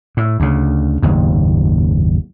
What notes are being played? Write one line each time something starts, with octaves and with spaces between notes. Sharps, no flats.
A2
D2 C#3
F#1 D#2 G#2